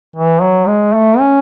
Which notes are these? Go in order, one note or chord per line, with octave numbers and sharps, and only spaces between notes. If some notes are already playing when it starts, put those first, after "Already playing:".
E3
F#3
G#3
A3
C#4